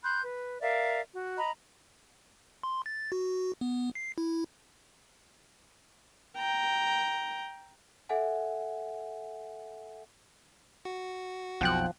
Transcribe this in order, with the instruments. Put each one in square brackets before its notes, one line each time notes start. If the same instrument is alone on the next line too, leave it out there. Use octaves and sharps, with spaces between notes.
[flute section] B5 C6 F#6 G6
B4
A#4 D5 E5 F5
F#4
D#5 A#5 B5
[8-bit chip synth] C6
A6
F#4
B3
C7
E4
[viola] G5 A#5
[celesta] A4 E5 F#5 G#5
[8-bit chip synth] F#4
[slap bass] B1 F2 [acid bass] F3 [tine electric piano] F#5 G5 F#6